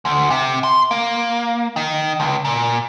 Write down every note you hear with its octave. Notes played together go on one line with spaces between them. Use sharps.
D2
C3
C6
A#3
D#3
C#2
A#2